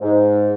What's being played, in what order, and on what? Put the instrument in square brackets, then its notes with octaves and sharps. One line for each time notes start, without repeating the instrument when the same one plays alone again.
[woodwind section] G#2